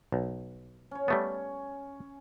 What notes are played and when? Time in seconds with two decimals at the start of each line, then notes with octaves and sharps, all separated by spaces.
0.12 B1
0.91 C#4 C#5
1.08 G3 A3 B3